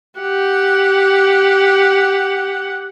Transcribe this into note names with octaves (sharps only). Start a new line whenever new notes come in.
G4 F#5